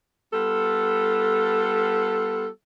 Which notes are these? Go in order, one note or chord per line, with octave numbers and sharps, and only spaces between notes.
G3 B3 F4 A4